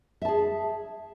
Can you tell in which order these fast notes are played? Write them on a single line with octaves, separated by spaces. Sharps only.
E5 A5 G#4